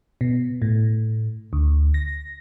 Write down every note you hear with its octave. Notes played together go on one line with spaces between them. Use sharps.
B2
A2
D2
A#6